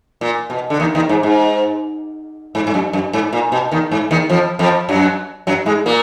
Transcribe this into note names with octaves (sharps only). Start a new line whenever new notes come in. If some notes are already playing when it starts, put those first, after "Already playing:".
A#2
B2
D3
D#2 D#3
D#2 D#3
G#2
G#2
G#2
G#2
F#2
F#2
G#2
A#2
B2
D#2 D#3
G#2
D#2 D#3
F2 F3
F2 F3
F#2 F#3
F#2 F#3
G#2 G#3
A#2 A#3